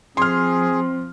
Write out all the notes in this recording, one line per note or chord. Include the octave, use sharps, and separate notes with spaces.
F3 C4 G#4 C6 F6